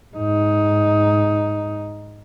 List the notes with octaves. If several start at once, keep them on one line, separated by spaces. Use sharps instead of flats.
G#2 D#4